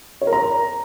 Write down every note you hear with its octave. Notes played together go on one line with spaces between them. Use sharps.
C#5
A#4
A#5